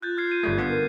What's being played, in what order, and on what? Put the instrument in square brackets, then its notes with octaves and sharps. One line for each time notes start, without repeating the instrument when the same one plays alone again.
[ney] F4 [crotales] F#6 G6 A6
[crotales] F6 G#6 C7
D#7
[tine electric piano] G1 G3 A3
[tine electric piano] D3 B3 F4 [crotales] G#6 C7
[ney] A#4